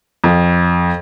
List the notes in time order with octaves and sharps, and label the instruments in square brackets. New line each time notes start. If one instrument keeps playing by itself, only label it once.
[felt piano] F2